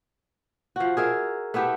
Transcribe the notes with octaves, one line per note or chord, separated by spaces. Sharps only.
F3 F#4
G#4 A#4 E5
A3 B3 E4 G4